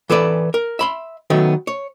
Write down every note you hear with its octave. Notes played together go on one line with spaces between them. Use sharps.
E3 A4 B4 D5
A#4
E5 B5 C6
D#3 F#3 A3 B3
C#5